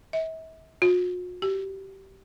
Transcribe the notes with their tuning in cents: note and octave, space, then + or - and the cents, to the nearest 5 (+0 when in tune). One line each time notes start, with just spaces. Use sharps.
E5 -40
F#4 -45
G4 -20